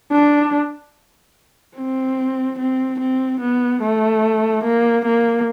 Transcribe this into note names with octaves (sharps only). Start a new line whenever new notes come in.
D4
C4
C4
C4
B3
A3
A#3
A#3